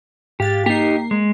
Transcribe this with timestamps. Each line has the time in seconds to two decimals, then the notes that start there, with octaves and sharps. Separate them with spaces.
0.40 G#2 G4 F5 A6
0.66 A#3 D#4 G4 C7
1.11 G#3